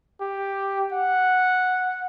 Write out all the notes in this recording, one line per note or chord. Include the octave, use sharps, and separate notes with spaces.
G4
F#5